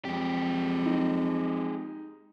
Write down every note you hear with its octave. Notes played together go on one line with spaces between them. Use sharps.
F2 G#3 G4
D#4